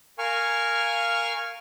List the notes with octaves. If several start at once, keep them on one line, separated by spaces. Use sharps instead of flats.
A#4 F5 G#5 C#6 F6